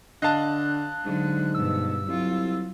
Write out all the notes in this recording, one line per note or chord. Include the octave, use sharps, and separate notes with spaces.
D3 D#5 F5 A5 F#6
G#2 D3 F#3
G2 B2 E6
C2 F#3 F4